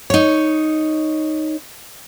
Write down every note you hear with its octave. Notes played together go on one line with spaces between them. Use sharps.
D#4 C#5